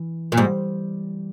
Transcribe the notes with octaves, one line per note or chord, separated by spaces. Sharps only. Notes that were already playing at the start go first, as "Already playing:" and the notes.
Already playing: E3
A#2
G#2 G3